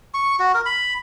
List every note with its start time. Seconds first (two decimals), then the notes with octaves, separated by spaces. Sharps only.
0.14 C#6
0.39 F#4
0.54 A#4
0.66 B5